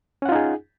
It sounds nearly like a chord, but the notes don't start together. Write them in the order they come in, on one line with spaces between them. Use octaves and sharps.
C#4 F#5 F4 D#4 G#4